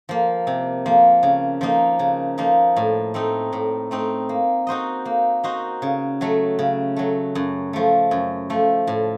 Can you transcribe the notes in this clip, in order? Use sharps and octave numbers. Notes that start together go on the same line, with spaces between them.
F3 A#3
C3
F3 A#3
C#3
F3 A#3 D#4
C#3
F3 A#3 D#4
A2
A3 C4 D#4
A2
A3 C4 D#4
A#3
D#4 F#4 C5 D#5
A#3
D#4 F#4 C5 D#5
C#3
F#3 A3
C#3
F#3 A3
F#2
F3 A3
F#2
F3 A3
A2